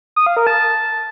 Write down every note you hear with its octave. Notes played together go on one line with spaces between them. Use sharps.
D#6
F5
A#4
A5